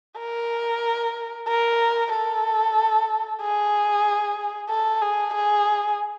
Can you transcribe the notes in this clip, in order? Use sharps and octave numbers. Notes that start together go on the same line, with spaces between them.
A#4
A#4
A4
G#4
A4
G#4
G#4